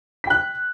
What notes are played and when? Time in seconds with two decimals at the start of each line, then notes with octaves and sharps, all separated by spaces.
0.24 B6
0.27 G5
0.30 F#6